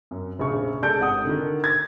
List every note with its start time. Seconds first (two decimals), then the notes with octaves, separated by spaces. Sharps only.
0.11 F#2
0.38 F1 A#1 C#3 C#6
0.82 G#3 D4 A4 G6 D7
0.99 G#1 C3 F#5 D#6
1.25 D3 D#3
1.64 G#6 A6